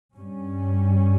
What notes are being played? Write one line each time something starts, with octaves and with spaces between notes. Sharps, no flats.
G2 G3 C#4